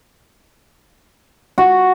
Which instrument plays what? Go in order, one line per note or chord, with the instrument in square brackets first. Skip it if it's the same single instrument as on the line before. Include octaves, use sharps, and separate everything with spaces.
[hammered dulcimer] F#4